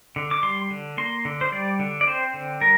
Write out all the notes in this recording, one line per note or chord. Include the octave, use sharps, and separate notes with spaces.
D3
D6
G3 C6
D3
A#3 C6
D3
C5
G3 D5
D3
D5
C4 C5
D3
G3 A#4